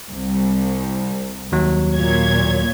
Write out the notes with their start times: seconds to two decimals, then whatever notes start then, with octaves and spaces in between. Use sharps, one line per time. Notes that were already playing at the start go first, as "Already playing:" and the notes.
0.11 C2
1.52 D#2 F#3
1.95 A#2 C#5 G#6